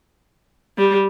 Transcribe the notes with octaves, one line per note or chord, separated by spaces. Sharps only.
G3